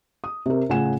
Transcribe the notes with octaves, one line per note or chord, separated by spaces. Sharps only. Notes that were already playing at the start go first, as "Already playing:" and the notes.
D#6
C3 A#4
A2 C#3 F4 F#5 G#5 E7